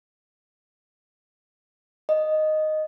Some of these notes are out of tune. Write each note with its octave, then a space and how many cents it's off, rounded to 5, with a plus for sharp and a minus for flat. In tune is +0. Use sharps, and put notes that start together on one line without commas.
D#5 -5